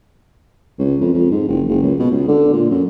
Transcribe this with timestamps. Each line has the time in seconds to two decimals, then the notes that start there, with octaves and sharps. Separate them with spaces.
0.79 C#2
1.01 F2
1.13 F2
1.31 G#2
1.48 F#1
1.69 F#1
1.82 C#2
1.99 B2
2.11 C#2
2.28 D3
2.53 A#2
2.70 F#2